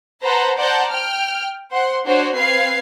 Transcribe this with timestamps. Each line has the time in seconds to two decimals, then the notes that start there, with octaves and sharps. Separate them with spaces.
0.23 B4 C5 F#5 A5 A#5
0.57 C5 D5 F#5 A5 A#5 G6
0.89 G5 F6
1.72 C5 F#5 C6
2.06 D4 F#4 C5 C#5
2.35 C4 B4 F5 G#6 C7